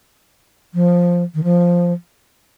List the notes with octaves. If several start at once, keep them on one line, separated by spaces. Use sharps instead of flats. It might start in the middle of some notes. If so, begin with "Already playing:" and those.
F3
D#3
F3